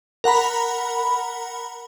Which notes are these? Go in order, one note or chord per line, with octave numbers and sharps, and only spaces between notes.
A#4 F#5 A#5 B5